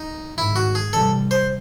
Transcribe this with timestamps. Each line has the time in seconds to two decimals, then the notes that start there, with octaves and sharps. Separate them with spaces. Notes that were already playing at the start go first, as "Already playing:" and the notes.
Already playing: D#4
0.38 G#2 D#3 F#3 E4
0.56 F#4
0.75 G#4
0.93 C3 E3 G3 A4
1.31 C5